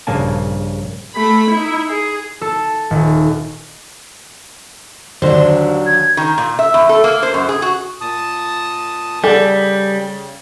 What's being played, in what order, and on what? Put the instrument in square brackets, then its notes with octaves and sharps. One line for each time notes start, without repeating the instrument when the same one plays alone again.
[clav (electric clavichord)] A#1 G2 C#3 A#3 G#5 A5
[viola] A3 B5
D#4 E4
G#4
[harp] A4
D#1
[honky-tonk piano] D#2 D3 [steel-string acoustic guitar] F#3 D4 [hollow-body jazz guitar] C5
[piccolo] G#6
[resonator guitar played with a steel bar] D#3
A#2
E5
E2
A4
A#3
C5
F#2
G#4
F#4
[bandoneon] A#2 A5 D#6
[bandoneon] C#3 [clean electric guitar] G3 [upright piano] G#4 D5 F#5 [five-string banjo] A4